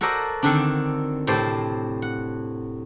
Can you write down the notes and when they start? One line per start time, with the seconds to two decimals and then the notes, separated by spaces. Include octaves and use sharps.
0.01 F#4 A4 A#4 C5 D5 D#5
0.43 D3 D#3 C4 D4
1.27 A2 C3 C4 C5 D5 A5
2.02 F#5